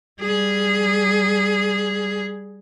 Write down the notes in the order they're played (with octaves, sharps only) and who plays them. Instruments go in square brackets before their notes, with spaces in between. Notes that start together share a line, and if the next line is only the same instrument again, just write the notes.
[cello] G3 G#4